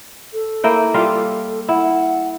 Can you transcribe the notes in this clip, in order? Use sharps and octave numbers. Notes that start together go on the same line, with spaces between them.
A4
A#3 E4 G5
G3 F4 F5
E4 F#5